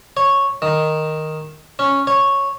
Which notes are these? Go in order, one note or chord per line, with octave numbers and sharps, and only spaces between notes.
C#5
D#3
C#4
C#5